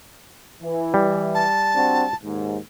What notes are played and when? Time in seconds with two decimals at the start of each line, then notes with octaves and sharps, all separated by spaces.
0.63 E3
0.94 G3
1.34 A5
1.75 C4 D4 F#4
2.23 D#2 G#2